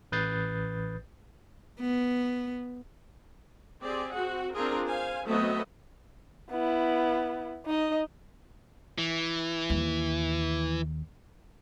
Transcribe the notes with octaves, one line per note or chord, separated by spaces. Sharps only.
A1 B4 D#6 G6 A6 C7
B3
C4 G4 G#4 D5
C4 F#4 F#5
C4 D4 F4 G#4 A#4
C5 F5 G#5
F#3 A3 B3 C4 D#5 E5
B3 E4
D#4 D#5
E3
D#2